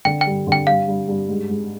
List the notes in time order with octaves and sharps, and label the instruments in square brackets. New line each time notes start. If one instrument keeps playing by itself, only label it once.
[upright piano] D3 [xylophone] G5
[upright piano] G2 [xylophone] G5
[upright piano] D3
[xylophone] G5
[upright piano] G2 [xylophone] F5
[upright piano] G2
G2
G#2
G#2